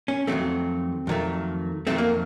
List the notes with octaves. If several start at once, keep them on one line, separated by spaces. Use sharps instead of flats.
C#4
F2 D#3 F#3 A3 C4
F2 D#3 F#3 A3
F2 D#3 F#3 A3 C4
A#3